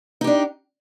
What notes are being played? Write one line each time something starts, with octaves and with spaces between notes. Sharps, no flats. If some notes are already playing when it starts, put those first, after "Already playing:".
D4 D#4 G4